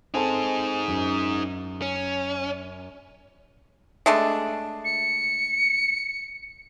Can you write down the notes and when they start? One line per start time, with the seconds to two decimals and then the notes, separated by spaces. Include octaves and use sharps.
0.14 C4 D#4 G#4 A4 A5
0.88 F#2
1.82 C#4
4.06 G#3 A3 D4
4.85 C#7